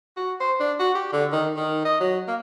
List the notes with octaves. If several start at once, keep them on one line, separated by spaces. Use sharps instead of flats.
F#4
C5
D4
F#4
G4
D3
D#3
D#3
D#5
F#3
A#3